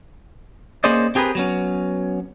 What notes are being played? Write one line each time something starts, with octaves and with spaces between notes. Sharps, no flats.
A#3 C#4 G#4 C5 D5 D#5
C4 G4 G#4 A#4 B4
F#3 B3 C#4